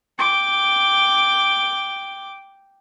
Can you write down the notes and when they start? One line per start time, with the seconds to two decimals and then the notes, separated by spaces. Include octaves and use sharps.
0.19 G5 D6